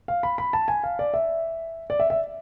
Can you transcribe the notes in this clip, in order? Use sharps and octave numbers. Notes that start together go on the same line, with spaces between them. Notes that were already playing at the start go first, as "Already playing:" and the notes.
F5
B5
B5
A5
G#5
F5
D5
E5
D5
E5
E5